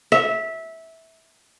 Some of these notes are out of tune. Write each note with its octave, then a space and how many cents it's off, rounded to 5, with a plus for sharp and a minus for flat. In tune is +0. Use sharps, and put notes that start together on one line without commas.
E5 -15